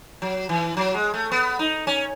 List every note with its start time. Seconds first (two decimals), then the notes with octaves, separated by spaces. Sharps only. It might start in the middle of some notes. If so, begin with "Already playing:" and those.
0.22 F#3
0.49 E3
0.77 F#3
0.94 G#3
1.14 A3
1.32 B3
1.59 D#4
1.87 C#4